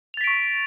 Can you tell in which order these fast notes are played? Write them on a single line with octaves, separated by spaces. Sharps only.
F7 A6 B6 D7 C#6